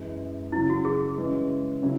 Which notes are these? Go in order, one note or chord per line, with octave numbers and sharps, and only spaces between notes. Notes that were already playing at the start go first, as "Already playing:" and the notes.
Already playing: F#2 E3 G#3
C#3 F#3 C#4 E4
F#4
G#4
C#3 E3 G#3 C#4
C#3 F#3 C#4 E4